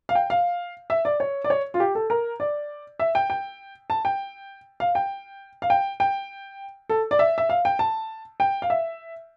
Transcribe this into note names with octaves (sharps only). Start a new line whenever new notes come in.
F5
G5
F5
E5
D5
C#5
D5
C#5
F4
G4
A4
A#4
D5
E5
G5
G5
A5
G5
F5
G5
F5
G5
G5
A4
D5
E5
E5
F5
G5
A5
G5
F5
E5